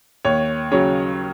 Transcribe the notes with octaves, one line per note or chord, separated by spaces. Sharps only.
D#2 C#5
C#3 F#3 C#5